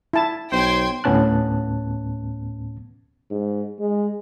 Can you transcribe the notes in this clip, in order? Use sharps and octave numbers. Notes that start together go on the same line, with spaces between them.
E4 A5
B1 C5 G5 C6 G#6
D2 A2 B3 C#4 A5 F#6
G#2
G#3